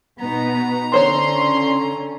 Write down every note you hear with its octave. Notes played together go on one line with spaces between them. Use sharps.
B2 B3 D#4 A#5
D3 E3 C#4 C5 C#5 C6